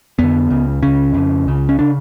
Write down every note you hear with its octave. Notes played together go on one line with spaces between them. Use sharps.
F2 D3 B3
C#2 C#3
C#2 C#3 C#4
F2 C#3
C#2 C#3
C#4
C#3 D4